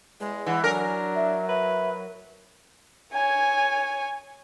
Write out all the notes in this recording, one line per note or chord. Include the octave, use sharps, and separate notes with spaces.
E2 G#3
E3 F#5
F#3 D4 A#4 G#5
E5
B4 E5
C#5 G#5